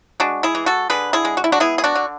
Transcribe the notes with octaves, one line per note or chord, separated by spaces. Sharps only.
G#3 D4 F#4
E4 G#4
E3
F#4 A4
D3 G#4 B4
E4 G#4
G#3
F#4
E4
D4 F#4
B3 E4 G#4
G#4
D4 F#4
D3